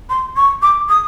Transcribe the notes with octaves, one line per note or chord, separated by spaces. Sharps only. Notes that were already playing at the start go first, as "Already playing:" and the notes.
C6
C#6
D6
D#6